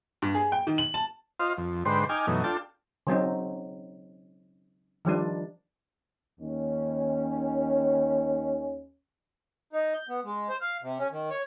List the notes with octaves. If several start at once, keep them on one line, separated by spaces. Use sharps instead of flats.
G2
G#4
G5
D#3
F#7
A5
F4 C5 D#5 F5
F2
G#2 D3 B4 C5 G5 C6
D#4 G5 G#5 D6 F6
F#2 B2 E3 A3 D#4
D4 F4 A4 G5 A5
C#3 F#3 C4 D#4
D#3 F3 G3 D4
D#2 C#4
D#4
G6
B3
G#3
C5
F5
C3
C#4
D#3
C#5